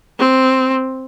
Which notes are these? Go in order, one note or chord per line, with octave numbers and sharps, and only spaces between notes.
C4